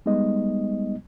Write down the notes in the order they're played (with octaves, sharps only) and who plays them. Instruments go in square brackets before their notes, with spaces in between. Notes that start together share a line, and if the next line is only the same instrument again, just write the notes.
[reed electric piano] G3 G#3 B3 D#4 D#5